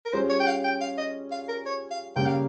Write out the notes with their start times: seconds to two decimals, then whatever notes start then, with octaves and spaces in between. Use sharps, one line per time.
0.05 A#4
0.13 G3 C#4 F4 G#4 C5
0.30 C#5
0.40 G5
0.47 F5
0.64 G5
0.81 F5
0.97 D#5
1.31 F5
1.48 A#4
1.66 C#5
1.91 F5
2.16 C#3 G3 A#3 G5
2.26 F5